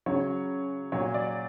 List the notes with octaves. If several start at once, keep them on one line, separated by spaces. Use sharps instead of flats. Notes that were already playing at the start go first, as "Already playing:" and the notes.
C#3 F#3 C#5
A#2 F#3 C#5
D5